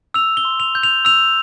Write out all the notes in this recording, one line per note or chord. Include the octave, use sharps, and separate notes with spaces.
E6 F7
G7
C6
F7
G6
F7
E6 F7